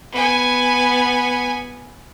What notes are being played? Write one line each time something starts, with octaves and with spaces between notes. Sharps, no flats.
B3 G#5